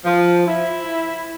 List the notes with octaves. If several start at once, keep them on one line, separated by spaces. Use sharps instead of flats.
F3
E4